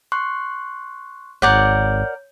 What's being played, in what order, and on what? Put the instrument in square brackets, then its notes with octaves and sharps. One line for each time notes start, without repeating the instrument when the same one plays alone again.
[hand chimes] C6 C#6 F#6
[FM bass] G#1 [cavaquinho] A#4 D5 F#5 [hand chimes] C#5 G6